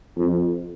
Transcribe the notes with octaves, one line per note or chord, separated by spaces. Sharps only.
F2